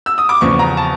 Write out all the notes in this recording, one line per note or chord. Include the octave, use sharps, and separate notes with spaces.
E6
D#6
D6
E2 C#3 F3 C#6
A#5
A5